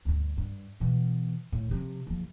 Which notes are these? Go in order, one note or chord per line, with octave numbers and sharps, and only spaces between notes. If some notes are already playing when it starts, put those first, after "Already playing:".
D2 G2
G2
B2 E3
A2
C3 F3
F#1 F3